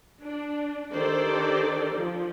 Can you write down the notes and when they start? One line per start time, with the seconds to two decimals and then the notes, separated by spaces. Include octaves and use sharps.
0.22 D4
0.94 D#3 D4 G4 A4 C5 D5
1.98 F3